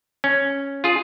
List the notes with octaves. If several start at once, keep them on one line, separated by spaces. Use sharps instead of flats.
C#4
F4 G#4